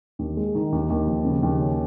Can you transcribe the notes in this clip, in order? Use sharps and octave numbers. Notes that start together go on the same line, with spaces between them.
D#2
G#3
D#3
D#2
D#2
F3
C#3
D#2
C#4